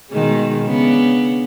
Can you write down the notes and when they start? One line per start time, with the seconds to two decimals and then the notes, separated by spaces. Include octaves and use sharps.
0.10 B2 D#3 G#3
0.66 C#3 B3 D4